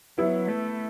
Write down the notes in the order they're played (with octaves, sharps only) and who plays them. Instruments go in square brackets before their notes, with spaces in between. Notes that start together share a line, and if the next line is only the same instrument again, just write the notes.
[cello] F#3 [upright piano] B3 E4
[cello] A3